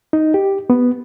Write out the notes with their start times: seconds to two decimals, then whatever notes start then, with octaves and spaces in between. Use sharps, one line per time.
0.13 D#4
0.34 G4
0.70 B3